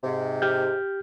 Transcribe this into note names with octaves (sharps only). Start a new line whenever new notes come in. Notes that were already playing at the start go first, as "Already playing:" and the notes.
G#2 C3
G4 F6 G6